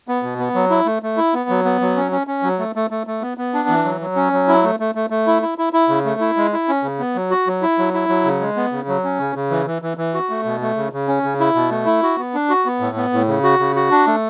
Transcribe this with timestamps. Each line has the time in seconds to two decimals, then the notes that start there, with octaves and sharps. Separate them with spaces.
0.08 B3
0.23 B2
0.39 B3
0.54 F#3
0.70 E4
0.86 A3
1.03 A3
1.17 E4
1.34 B3
1.49 F#3
1.65 B3
1.81 F#3
1.96 C#4
2.12 C#4
2.27 C#4
2.43 F#3
2.59 A3
2.76 A3
2.90 A3
3.07 A3
3.21 B3
3.38 B3
3.54 D4
3.69 E3
3.84 F#3
4.01 F#3
4.16 C#4
4.33 F#3
4.48 E4
4.63 A3
4.80 A3
4.95 A3
5.10 A3
5.27 E4
5.42 E4
5.58 E4
5.73 E4
5.89 C#3
6.05 A3
6.21 E4
6.37 G#3
6.53 E4
6.68 C#4
6.83 C#3
6.99 B3
7.16 F#3
7.31 F#4
7.47 F#3
7.62 E4
7.79 F#3
7.93 E4
8.09 F#3
8.24 C#3
8.41 G#3
8.56 B3
8.72 C#3
8.88 F#3
9.04 C#4
9.19 C#3
9.36 C#3
9.50 E3
9.66 E3
9.82 E3
9.97 E3
10.14 F#4
10.30 A3
10.45 B2
10.61 A3
10.77 C#3
10.93 C#3
11.08 C#4
11.24 C#3
11.40 E4
11.55 B2
11.70 A3
11.86 E4
12.03 F#4
12.18 B3
12.34 D4
12.49 F#4
12.66 B3
12.80 A2
12.96 B3
13.13 A2
13.27 C#3
13.43 F#4
13.59 C#3
13.76 F#4
13.91 D4
14.07 A3